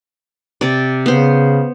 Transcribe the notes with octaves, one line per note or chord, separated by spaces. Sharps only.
C3 D5
C#3 B3 C5